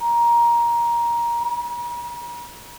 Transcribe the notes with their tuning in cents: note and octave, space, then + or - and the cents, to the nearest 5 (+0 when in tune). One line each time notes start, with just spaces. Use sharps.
A#5 +15
A#5 +45